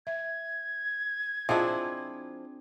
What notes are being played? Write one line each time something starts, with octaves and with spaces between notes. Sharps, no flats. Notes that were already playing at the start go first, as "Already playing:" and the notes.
E5 G#6
F3 C4 D4 E4 F4 G#4 C5 D#5